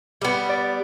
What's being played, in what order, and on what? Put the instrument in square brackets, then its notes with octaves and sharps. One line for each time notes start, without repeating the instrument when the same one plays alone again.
[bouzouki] G3 B3
[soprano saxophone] D5